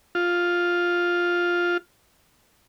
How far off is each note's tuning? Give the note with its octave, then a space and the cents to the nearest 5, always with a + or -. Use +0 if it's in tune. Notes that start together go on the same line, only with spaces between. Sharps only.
F4 +5